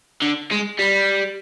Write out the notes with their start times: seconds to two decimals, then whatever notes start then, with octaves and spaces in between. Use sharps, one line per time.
0.22 D3
0.51 G#3
0.79 G3